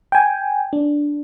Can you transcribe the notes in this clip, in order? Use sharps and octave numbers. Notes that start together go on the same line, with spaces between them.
G5 G#5
D4